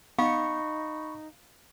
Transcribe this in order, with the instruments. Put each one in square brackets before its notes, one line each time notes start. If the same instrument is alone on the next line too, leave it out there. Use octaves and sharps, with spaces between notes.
[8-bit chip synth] B3 C#7 [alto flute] D#4 [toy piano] F5 [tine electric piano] B5 C#6